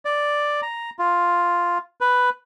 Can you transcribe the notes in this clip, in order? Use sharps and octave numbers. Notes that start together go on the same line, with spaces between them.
D5
A#5
F4
B4